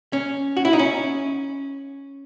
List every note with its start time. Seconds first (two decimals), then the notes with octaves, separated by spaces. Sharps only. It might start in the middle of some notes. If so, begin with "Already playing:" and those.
0.13 C#4
0.57 F#4
0.65 E4
0.73 D#4
0.79 C#4